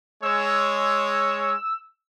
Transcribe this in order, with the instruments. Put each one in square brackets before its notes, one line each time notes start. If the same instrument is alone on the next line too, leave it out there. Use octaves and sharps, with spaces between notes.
[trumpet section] G#3 C#5 [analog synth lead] E6